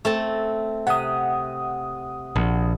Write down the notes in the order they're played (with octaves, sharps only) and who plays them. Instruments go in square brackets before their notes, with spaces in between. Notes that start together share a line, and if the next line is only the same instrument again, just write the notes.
[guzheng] A3 C4 A5
[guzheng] C3 [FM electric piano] F#5 D#6
[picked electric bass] A#1